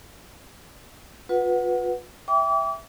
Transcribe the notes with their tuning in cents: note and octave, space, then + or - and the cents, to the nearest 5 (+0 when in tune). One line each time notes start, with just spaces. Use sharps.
F4 +40 B4 +0 F#5 +0
E5 +0 G5 +15 D6 -35